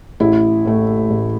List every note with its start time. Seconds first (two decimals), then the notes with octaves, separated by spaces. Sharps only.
0.20 A1 E4
0.65 A2 A3
1.10 A1